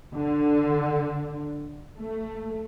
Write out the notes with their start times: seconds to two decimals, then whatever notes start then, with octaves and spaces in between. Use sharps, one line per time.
0.16 D3
1.97 A3